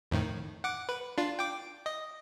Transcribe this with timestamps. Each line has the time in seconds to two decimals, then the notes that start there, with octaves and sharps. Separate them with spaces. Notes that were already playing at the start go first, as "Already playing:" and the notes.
0.11 F2 A2 D#3
0.64 F#5 D6
0.89 B4
1.18 D4 F4
1.39 G5 D6
1.86 D#5